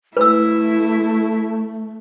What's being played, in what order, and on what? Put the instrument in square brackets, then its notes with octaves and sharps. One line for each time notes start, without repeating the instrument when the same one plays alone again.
[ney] A3 [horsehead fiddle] E4 [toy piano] B4 E6